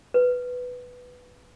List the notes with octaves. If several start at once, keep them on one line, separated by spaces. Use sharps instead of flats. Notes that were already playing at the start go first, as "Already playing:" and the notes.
B4